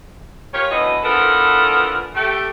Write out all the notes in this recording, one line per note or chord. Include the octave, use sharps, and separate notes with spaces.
F4 G4 A#4 C#5
D2 B2 E3 B4 D#5
D3 E3 F3 B3 A4 A#4
A3 G4